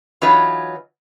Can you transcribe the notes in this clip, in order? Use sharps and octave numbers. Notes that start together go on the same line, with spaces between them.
E3 F#3 D#4 F4 B4 C#5